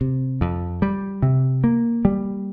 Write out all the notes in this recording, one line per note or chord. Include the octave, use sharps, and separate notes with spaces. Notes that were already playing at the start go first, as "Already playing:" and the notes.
C3
F2
G3
C3
A#3
G3